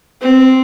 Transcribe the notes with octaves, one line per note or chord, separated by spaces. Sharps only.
C4